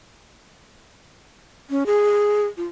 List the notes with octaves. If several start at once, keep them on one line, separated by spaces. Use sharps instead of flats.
C#4
G#4
F4